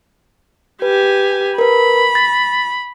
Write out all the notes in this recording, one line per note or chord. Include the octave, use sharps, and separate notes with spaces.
G4 B4 G#5
A#4 B4 B5
A6